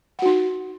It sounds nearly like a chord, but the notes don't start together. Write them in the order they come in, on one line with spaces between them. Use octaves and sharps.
F#5 F#4 D#4